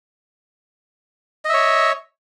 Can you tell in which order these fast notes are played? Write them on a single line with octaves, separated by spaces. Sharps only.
D#5 E5 C#5